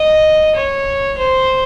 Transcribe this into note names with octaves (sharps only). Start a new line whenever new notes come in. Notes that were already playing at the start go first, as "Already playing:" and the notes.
Already playing: D#5
C#5
C5